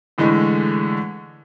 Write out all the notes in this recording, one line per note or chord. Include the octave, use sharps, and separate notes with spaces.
A2 D3 E3 G#3 A3